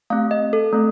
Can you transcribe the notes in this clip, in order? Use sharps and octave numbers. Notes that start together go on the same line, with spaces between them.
A3 C4 G4 F5
D#5
A4
A3 C4